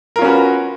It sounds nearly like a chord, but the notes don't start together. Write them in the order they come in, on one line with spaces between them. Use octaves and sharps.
A#4 F4 C#4 F#4 B4